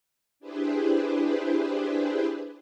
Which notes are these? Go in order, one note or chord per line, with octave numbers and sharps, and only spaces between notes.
D4 E4 G4 G#4 B4 C5